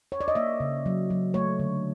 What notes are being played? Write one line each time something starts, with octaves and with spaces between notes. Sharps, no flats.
C#5
D5
D#5
A#3 E5
C#3
F#3
F#3
A3 C#5
D3